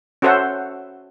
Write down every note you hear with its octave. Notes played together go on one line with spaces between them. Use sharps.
C#4 F#4 A4 C5 E5 F#5